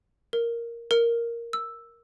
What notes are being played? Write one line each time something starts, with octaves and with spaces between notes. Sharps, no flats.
A#4
A#4
E6